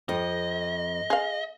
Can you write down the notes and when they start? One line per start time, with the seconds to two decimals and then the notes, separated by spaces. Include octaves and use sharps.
0.09 F2 D#5
1.10 G#4 F5